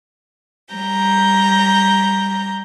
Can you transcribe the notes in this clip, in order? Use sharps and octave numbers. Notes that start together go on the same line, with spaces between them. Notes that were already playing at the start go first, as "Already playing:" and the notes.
G3 A#5 G6